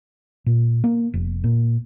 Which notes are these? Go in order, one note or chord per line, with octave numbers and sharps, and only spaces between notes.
A#2
A#3
F1
A#2